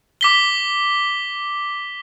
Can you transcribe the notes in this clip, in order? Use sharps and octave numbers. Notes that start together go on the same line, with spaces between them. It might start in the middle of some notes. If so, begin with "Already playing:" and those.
D6 B6 G7